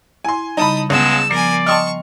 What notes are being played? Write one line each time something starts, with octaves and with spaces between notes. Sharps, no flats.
E4 G#5 C6
C#3 G3 D#4 A5 B5 D#6
C#2 G#3 B3 A5 E6
F3 B3 A#4 D5 G#5 C7
D#5 G5 A5 C6 C#6 D#6 F6